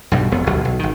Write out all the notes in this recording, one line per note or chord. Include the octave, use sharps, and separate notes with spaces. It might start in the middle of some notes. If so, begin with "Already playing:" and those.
B1 G2 B2 G3
E1 F2 B3
G1 D2 B2 F#3
B1
G#1 D#3